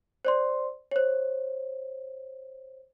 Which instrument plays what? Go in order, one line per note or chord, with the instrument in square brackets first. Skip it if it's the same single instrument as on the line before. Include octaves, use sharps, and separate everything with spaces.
[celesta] C5 D5 C6
C5 C#5